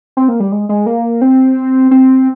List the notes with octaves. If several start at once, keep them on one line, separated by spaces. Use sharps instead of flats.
C4
A#3
G3
G#3
G#3
A#3
C4
C4